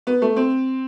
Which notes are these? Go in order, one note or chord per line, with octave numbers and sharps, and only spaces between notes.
B3
A3
C4